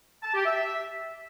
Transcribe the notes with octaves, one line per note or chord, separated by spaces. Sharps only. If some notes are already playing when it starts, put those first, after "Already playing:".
A5
G4
E5